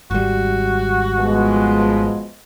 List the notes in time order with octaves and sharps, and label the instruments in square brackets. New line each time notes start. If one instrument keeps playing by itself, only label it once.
[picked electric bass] G#1 G3 [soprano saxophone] F#4
[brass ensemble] B2 F3 G#3